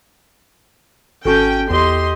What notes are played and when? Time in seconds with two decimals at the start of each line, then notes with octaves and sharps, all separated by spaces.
1.25 G#1 C#4 F#4 A4 G5 A5
1.70 E2 G4 D#5 C6